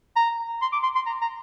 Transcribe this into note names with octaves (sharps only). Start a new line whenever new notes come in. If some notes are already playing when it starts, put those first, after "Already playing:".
A#5
C6
D6
C6
C6
A#5
A#5